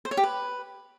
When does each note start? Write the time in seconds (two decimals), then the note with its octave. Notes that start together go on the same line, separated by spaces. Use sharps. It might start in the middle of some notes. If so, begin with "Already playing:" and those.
0.05 C5
0.11 C#5
0.17 G4
0.23 B4